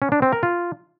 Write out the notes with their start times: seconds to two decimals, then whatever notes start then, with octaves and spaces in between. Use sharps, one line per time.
0.02 C#4
0.12 D4
0.22 C4
0.33 A#4
0.43 F4